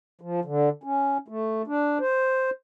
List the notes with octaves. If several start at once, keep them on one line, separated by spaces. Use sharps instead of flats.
F3
D3
C#4
A3
D4
C5